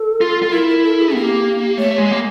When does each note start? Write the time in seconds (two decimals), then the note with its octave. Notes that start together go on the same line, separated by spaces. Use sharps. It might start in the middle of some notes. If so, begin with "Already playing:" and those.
Already playing: A4
0.21 F4
0.42 F4
0.52 E4 A#4
0.68 A#4
0.84 A4
0.99 G#4
1.09 G#4
1.15 A#3 G4
1.77 A3 C#5
1.98 G#3
2.11 A#3